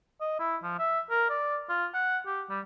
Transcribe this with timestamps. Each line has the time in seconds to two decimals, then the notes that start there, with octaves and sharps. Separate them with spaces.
0.21 D#5
0.40 E4
0.63 F3
0.79 E5
1.10 A#4
1.30 D5
1.69 F4
1.94 F#5
2.26 G4
2.50 G3